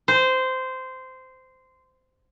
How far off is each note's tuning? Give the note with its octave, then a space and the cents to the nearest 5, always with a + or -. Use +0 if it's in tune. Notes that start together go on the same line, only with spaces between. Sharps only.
C5 -15